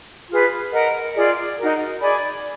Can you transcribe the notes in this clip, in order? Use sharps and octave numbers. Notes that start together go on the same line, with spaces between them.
F4 G#4 B4
A#4 D#5 F#5
F4 G#4 D5
D#4 F#4 A#4
G#4 D5 G#5 B5